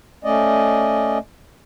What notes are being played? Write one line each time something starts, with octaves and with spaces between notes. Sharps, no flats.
A3 C#4 D5 D#5